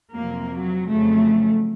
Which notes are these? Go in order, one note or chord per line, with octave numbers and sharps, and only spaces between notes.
F2 C3 F#3 A#3
F#3
F2 C#3 F#3 A3